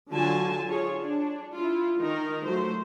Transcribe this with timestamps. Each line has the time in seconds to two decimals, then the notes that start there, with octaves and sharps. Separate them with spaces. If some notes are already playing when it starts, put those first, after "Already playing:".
0.11 D3 F#3 F4 G#5 A5
0.68 F4 G#4 C#5
1.00 D4
1.56 E4 F4
1.98 D#3 D#4 A#4
2.45 F#3 A3 C5